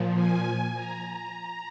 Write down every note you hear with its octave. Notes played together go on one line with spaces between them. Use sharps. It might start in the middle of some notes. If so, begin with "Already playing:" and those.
Already playing: A#2 F3
G#5
A#5
A#5